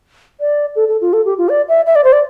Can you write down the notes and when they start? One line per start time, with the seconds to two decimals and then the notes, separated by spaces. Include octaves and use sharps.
0.40 D5
0.76 A4
0.88 A4
1.01 F4
1.13 A4
1.25 G4
1.38 F4
1.49 D5
1.68 E5
1.86 E5
1.95 D5
2.04 C5
2.12 D5